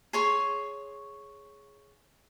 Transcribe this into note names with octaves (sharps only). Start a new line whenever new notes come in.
G#4 C#5 C6